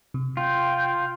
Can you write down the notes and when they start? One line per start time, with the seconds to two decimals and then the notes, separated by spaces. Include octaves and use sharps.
0.14 C3
0.37 F4 G5